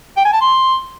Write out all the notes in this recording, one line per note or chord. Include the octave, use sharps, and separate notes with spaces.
G5
G#5
A5
C6